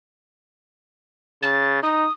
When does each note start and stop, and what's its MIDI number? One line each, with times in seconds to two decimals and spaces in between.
1.43 1.80 49
1.43 1.80 93
1.83 2.06 63
1.83 2.12 87